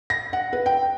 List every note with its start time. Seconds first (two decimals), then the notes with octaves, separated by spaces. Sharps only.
0.10 A#6
0.33 F#5
0.53 B4
0.66 G5